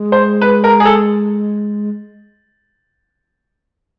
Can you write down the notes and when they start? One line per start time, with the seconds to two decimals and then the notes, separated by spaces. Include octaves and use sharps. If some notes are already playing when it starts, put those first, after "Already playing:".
Already playing: G#3
0.12 C5
0.41 B4
0.64 A#4
0.80 G#4
0.85 A4